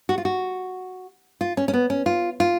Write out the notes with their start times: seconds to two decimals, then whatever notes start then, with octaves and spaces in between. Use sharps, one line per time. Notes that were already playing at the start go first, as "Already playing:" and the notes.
0.09 F#4
0.18 F4
0.25 F#4
1.41 F4
1.57 C#4
1.68 C#4
1.74 B3
1.90 C#4
2.06 F4
2.40 F4